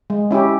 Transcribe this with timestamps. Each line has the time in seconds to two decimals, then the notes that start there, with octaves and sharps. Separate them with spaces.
0.10 G#3
0.31 C#4 E4 G4